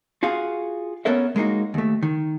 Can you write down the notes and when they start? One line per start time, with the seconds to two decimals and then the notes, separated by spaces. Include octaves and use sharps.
0.23 F4 F#4 G#4 F5
1.05 B3 C#4 A4 A#4 E5
1.36 G#3 A#3 D4 D#4 F#4
1.74 D#2 A3
2.03 D#3